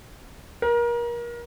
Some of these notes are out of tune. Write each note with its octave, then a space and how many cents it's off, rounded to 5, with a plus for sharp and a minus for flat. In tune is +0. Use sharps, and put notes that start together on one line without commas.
A#4 +30